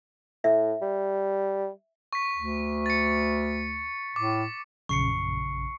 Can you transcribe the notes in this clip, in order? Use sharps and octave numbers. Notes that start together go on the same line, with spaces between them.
A2 E5
G3
C#6 B6
D2
A6 C#7
A2 D6
A#1 F#2 C#3 C#6 C7 C#7